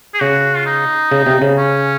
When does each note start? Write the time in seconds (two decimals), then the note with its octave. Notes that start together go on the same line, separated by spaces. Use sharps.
0.14 G#4
0.20 C#3 F#4
0.56 F4
0.66 D#4
1.11 C#3
1.26 C3
1.42 C#3
1.57 C#4